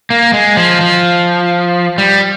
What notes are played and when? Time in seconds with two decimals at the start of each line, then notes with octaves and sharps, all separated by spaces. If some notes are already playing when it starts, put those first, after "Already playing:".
0.10 A#3
0.34 G#3
0.57 F3
0.81 F3
1.98 G3